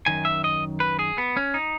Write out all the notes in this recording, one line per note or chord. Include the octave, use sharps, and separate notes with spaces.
F#2 D#3 G#5
E5
D#5
B4
G#4
B3
C#4
D#4